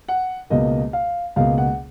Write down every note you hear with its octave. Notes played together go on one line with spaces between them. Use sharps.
F#5
C#2 B2 A#3 D#5
F5
C#2 B2 A#3 F5
F#5